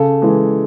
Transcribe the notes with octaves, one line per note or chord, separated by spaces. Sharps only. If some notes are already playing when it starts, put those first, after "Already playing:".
Already playing: C#3 A4
E3 G#3